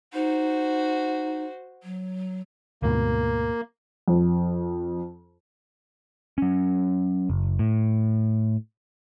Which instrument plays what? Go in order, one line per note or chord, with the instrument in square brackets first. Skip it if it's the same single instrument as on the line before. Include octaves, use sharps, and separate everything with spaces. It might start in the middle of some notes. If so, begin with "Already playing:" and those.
[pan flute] D#4 [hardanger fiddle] F#4 C5
[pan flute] F#3
[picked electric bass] D2 G#2 B2 [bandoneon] A#3
[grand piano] F2
[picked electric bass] F#3 C#4
F#1
A2